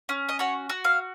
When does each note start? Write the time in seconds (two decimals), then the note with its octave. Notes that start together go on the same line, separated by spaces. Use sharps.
0.09 C#4
0.29 D#5
0.39 F#4 C#5
0.70 F#4
0.84 F5